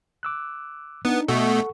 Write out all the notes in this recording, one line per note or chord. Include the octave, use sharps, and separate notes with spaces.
D6 E6 F#6
B3 D4 D#4
B2 A3 A4 F#5 C#6